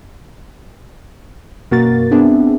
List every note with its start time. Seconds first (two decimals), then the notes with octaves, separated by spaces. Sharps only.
1.71 F#2 B2 A#3 F#4 A#4 A6
2.11 B3 C4 D4 G#4 E5